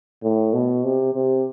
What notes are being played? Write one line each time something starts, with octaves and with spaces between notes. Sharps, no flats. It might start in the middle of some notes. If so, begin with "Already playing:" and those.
A2
B2
C3
C3